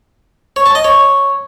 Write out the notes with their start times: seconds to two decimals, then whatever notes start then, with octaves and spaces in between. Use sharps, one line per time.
0.56 C#5
0.66 A5
0.75 D#5
0.85 C#5